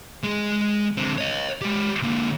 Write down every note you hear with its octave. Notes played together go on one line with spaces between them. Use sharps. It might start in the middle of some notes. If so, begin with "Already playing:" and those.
G#3 G#4
D3 C4
C#5 D#5
G#3 G4
D3 A#3